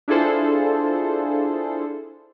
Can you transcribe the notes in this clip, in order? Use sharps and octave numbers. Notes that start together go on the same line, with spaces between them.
D4 E4 F4 G#4 A4 C5